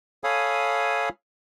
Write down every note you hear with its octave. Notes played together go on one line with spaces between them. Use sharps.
A4 C#5 F5 G#5 B5 D#6